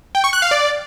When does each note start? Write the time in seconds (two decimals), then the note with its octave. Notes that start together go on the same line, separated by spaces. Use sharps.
0.15 G5
0.24 C#6
0.33 F#6
0.42 F5
0.51 D5